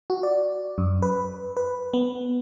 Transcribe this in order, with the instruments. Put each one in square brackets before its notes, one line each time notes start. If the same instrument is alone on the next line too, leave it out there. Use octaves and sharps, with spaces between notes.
[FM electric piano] F#4
D5
F#2
B4
B4
B3